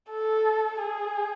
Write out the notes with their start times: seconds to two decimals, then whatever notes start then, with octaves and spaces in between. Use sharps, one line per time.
0.11 A4
0.81 G#4